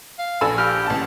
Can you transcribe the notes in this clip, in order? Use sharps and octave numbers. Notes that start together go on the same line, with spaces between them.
F5
A#1 A4 G#5 B5
G4 F6
A1 A5